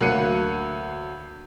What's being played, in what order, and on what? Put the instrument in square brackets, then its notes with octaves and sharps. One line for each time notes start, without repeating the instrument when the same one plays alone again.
[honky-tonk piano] D2 F#3 A#3 F#6 C#7 D#7